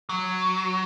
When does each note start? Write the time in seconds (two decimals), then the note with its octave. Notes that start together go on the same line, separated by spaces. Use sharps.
0.09 F#3